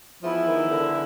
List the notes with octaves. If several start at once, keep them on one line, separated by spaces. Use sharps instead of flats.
E3 F3 G#3 B3 E4
D#3
D3